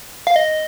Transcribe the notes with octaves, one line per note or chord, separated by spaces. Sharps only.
F5
D#5